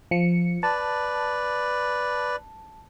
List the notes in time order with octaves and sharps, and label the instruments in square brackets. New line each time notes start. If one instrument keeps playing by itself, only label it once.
[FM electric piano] F3 C#7
[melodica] B4 D5 [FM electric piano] A5